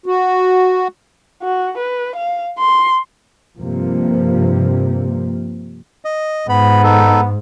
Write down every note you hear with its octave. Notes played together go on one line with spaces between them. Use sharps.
F#4
F#4
B4
F5
C6
G2 C3 F3 A#3
D#5
G#2 B3 B5
D#4 A4